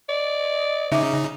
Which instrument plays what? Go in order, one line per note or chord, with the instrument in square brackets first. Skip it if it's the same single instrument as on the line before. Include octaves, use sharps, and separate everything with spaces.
[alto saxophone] D5 [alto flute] D#5
[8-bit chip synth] C#3 D#4 [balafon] E5 D6